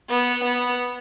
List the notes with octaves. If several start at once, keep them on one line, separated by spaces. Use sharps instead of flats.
B3
B3